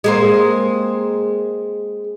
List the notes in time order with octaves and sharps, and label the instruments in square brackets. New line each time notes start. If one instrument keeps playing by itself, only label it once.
[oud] G#3 A#3 C4